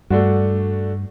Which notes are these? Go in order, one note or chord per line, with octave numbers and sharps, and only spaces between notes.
G2 A3 D4 F#4